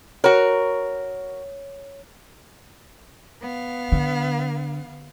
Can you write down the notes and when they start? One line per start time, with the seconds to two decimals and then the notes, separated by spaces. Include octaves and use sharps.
0.24 F#4 A#4 C#5
3.42 B3 F5
3.92 D3